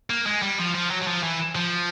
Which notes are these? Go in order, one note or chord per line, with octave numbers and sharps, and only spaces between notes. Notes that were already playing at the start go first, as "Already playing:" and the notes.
A#3
G#3
G3
F3
F3
F#3
F#3
F3
E3
F3